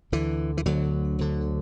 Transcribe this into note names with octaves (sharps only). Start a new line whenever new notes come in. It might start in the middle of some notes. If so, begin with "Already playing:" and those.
D2 D3 E3
E3
D2 D3 F#3
D2 D3